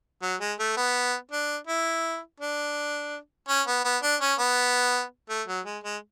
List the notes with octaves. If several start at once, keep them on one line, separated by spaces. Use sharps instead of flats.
F#3
G#3
A3
B3
D4
E4
D4
C#4
B3
B3
D4
C#4
B3
A3
F#3
G#3
G#3